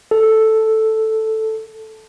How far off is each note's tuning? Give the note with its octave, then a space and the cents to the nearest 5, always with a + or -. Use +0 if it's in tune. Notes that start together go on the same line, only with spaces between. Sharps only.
A4 +0